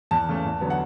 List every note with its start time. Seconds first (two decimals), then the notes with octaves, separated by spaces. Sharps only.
0.11 E2 A5
0.28 C#3 E3 A3
0.45 E2
0.61 D3 F#3 B3
0.70 F#5